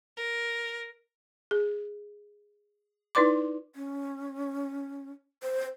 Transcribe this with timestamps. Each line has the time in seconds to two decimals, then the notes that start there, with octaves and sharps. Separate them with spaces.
0.17 A#4
1.51 G#4
3.15 D#4 E4 B4 D5 C6 D6
3.76 C#4
5.43 C5